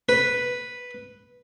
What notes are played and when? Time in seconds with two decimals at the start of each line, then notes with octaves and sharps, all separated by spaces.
0.09 B4